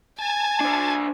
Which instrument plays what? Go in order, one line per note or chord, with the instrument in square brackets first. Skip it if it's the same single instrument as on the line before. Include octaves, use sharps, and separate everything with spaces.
[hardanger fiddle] G#5 [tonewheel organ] A5
[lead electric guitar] D4 C5